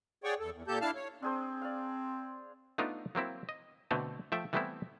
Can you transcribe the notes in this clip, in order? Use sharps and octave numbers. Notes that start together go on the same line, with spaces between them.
G#4 C#5 D5 F#5 G5 C#6
E2 A4
E2
A#2 A#3 G4 A4 A5 G6
D4 E4 F5 A5 F6
C#5
C4 D4 G#4 C5
D5 F5
A3 B3 D4 D#4 F4
F#3 A#3 C4 E4
D#5
B2 D3 A3 C4
F3 A3 E5 G5
E3 G3 A3 B3 C4 E4